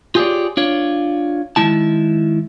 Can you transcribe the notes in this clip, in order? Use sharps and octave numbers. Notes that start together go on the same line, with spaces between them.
F4 G4 G#4 B4 C#5 D5
D4 F4 C#5
D#3 G#3 E4 A5